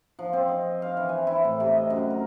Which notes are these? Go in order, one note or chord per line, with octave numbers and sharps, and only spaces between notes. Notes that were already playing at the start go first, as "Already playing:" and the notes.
F3
C4
D#5
F5
E3
G#5
E4
A2
C3
D#5
F#2
A#4